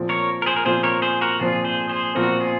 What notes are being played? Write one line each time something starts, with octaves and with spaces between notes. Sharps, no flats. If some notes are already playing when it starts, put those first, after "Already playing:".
Already playing: A#2 F3 C4
A#4 C#5
A#4
G#4 C5
A#4
A#2 F3 C4 G#4 C5
A#4 C#5
G#4 C5
F#4 A#4
A#2 F3 C4 F4 G#4
G#4 C5
G#4 C5
A#2 F3 C4 F#4 A#4
F4 G#4